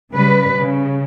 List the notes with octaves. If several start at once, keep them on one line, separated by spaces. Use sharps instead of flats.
C#3 G3 B4
C#3